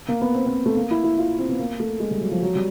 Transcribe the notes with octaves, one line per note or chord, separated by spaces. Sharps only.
A#3
B3
C4
C4
A3
A#3
E4
E4
F4
C4
B3
A#3
A3
G#3
G3
F#3
F3
F#3
G3